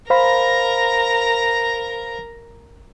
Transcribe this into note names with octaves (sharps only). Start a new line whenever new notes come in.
A#4 C5 F5 A#5 B5